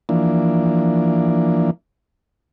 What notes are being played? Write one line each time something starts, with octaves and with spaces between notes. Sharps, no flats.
E3 F3 A#3 D4